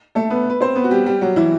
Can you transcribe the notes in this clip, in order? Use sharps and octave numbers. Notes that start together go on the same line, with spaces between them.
A3 A4
B3 B4
B4
C4 C5
B3 B4
F#4
G3 G4
G3 G4
F#3 F#4
E3 E4